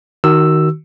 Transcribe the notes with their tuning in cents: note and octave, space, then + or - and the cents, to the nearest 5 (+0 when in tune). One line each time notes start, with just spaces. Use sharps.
D#3 +0 F#4 +25 E6 +5